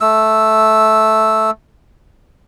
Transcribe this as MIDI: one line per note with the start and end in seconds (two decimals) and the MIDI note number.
0.01 1.50 57
0.01 1.50 88